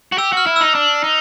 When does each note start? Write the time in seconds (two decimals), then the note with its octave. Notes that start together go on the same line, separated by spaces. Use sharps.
0.12 F#4
0.18 G4 E6
0.33 F#4 F6
0.47 E4
0.56 D#4 E6
0.75 D4
1.04 D#4